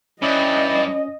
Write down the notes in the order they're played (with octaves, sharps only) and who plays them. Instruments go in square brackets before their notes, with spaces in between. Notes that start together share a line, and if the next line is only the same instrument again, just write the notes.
[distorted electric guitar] G2 [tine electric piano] C#4 D#6 [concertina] E4 D5 [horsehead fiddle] D#5